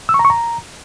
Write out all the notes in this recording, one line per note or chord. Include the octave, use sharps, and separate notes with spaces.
E6
C#6
A#5
C#6
A#5